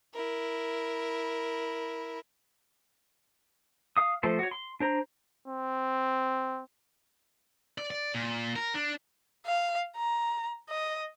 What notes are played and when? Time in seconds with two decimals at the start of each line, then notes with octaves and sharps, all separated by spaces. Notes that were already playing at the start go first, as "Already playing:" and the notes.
0.14 E4 A#4
3.97 F5 D#6
4.23 F3 A3 A4 C5
4.39 F#4 C#5
4.51 C6
4.80 D4 C5 A#5
5.48 C4
7.78 D5
7.90 D5
8.14 A#2
8.56 A#4
8.75 D4
9.47 F5
9.97 A#5
10.70 D#5